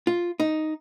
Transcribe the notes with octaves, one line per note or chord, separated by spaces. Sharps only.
F4
D#4